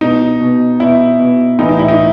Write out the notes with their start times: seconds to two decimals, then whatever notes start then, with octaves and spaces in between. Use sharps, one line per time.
0.01 B2 D#4
0.40 B2
0.80 B2 E4
1.20 B2
1.59 A2 E3 D#4
1.69 D#4
1.79 E4
1.88 D#4